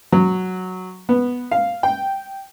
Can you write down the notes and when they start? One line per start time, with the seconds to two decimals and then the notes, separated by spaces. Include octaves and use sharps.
0.12 F#3
1.09 B3
1.51 F5
1.83 G5